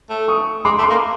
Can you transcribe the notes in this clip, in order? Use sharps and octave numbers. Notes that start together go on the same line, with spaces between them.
A3
C#6 D#6
G#3 C6 D6
A3
C6 D6
A#3